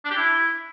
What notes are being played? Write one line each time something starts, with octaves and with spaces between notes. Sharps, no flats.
D4
G4
E4